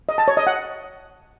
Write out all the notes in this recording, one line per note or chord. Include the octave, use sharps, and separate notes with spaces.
D#5
A5
C#5
D#5
F#5